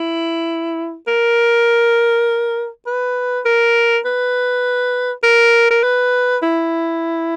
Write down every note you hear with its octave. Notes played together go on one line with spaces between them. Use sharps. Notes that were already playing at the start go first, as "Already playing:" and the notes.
Already playing: E4
A#4
B4
A#4
B4
A#4
A#4
B4
E4